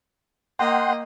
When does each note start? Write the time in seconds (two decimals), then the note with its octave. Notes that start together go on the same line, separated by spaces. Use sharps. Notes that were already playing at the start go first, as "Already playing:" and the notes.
0.59 A#3 D#5 F#5 G5 C6